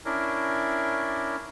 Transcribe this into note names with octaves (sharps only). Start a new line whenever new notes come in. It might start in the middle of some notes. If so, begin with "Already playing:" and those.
C#4 D4 E4 A#4